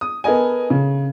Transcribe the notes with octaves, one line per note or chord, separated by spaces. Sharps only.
D#6
B3 A4 A#4 D#5 G#5
C#3